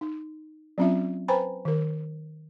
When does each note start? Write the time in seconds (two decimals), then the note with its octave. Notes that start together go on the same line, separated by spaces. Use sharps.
0.01 D#4
0.78 F#3 C4 C#4 F4 E5
1.28 B4 C5 G5 G#5 A#5 B5
1.65 D#3 A#4